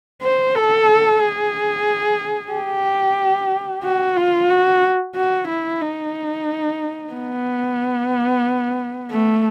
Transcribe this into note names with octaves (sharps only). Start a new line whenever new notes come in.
C5
A4
G#4
G4
F#4
F4
F#4
F#4
E4
D#4
B3
A3